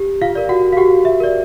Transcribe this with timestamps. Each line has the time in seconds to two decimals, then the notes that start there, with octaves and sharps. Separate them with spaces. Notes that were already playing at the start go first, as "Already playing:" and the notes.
Already playing: G4
0.21 F4 F5
0.35 A#4 D5
0.49 F#4 F#5
0.73 F5
0.77 F#4 G4 F#5
1.05 E5
1.20 A#4 D5